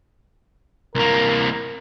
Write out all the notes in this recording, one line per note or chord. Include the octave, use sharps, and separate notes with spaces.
C2 A#3 A#4